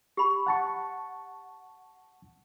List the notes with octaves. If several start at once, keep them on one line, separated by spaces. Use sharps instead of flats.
G4 B5
F#5 A5 C#6